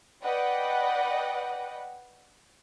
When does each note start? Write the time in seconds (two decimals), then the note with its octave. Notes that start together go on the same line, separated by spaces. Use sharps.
0.23 B4 D5 D#5 F#5 G5